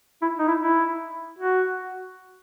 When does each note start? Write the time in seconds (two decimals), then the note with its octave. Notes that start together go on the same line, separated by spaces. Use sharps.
0.22 E4
0.39 D#4
0.48 E4
0.61 E4
1.39 F#4